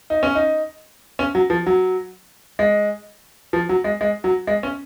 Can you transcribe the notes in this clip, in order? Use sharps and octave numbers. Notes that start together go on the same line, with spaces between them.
D#4
C#4
D#4
C#4
F#3
F3
F#3
G#3
F3
F#3
G#3
G#3
F#3
G#3
C#4